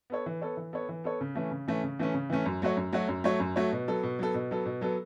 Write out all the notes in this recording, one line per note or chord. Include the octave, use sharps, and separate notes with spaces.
B3 A4 C#5
E3
B3 A4 C#5
E3
B3 A4 C#5
E3
B3 A4 C#5
C#3
E3 A3 C#4
C#3
E3 A3 C#4
C#3
E3 A3 C#4
C#3
E3 A3 C#4
F#2
F#3 A3 F#4 C#5
F#2
F#3 A3 F#4 C#5
F#2
F#3 A3 F#4 C#5
F#2
F#3 A3 F#4 C#5
B2
F#3 B3 A4
B2
F#3 B3 A4
B2
F#3 B3 A4
B2
F#3 B3 A4